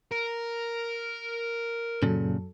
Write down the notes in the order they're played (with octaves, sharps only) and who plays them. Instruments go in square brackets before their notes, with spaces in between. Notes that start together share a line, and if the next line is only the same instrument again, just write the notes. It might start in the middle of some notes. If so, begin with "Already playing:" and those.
[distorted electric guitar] A#4
[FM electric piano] F#2 F#3 A4 [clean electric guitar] A#2 C#3